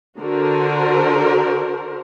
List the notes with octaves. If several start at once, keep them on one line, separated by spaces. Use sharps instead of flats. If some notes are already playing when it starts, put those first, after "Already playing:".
D3 F#4 A#4 C5